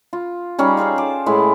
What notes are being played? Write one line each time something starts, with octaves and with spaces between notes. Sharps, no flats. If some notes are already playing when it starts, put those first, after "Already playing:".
F4
G3 C#4 D#4 G#4
F4 G#4 C5 C#5
A4 D6
A2 G#3 B4